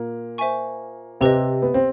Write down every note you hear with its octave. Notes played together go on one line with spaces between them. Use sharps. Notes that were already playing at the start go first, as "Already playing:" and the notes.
Already playing: A#2 A#3
C5 E5 G#5 C#6
C3 C4 G4 B4 D#5
B3
C4